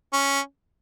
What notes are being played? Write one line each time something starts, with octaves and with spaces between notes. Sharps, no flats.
C#4